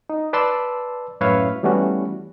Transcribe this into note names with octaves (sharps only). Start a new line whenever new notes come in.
D#4
B4 D5 A5 C6 E6
F#2 A2 B4 C#5 E5 F5
E3 G3 A3 B3 C#4 F#4